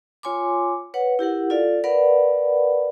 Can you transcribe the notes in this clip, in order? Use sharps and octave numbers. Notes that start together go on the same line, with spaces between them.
F4 C#5 G#5 C6 D6
B4 C#5 F#5
E4 G4 A#4 F#5
F4 A4 D5 F5
A#4 B4 D5 F5 F#5 B5